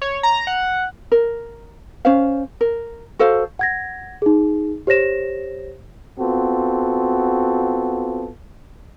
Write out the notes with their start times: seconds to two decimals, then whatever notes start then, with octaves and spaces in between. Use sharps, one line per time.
0.02 C#5
0.23 A#5
0.47 F#5
1.12 A#4
2.05 C#4 C5 F5
2.61 A#4
3.19 F#4 A4 C5 F5
3.59 F#5 G#6 A#6
4.22 D#4 G#4
4.87 G4 C5 C#5 A#6 E7
6.19 B3 C4 F4 F#4 A4